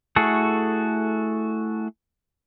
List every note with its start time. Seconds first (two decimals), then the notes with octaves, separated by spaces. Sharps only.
0.16 A3 E4 F#4 G#4 A4